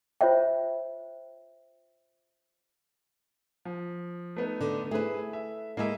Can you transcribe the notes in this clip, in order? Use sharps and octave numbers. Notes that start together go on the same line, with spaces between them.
F4 C5 C#5 E5 G5
F3
A3 B3 D#4
D3
A3 E4 G#4 B4
E5
G#3 A#3 E4 D#5 E5